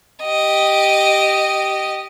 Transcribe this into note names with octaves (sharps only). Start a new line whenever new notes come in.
G4 D#5